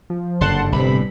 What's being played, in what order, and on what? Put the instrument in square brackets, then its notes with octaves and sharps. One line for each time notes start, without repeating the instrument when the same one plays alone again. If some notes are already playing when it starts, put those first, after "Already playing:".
[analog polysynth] F3
[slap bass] F#1 G2 D3 [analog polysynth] F#5 A5 C6
[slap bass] G1 A2 [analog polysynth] C3 B5